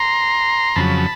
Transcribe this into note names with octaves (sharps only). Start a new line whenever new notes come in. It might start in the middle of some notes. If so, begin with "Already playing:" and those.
Already playing: A#5 C6
F2 C#3 F#3 A5 B5